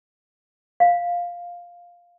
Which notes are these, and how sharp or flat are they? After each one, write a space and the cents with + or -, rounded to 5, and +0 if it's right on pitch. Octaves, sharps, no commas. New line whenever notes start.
F5 +5